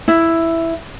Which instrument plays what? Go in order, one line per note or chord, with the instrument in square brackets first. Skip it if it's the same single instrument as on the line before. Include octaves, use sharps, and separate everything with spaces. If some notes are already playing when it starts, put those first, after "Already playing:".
[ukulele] E4